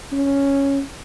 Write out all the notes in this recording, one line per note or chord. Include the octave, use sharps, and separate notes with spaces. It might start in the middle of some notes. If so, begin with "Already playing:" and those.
C#4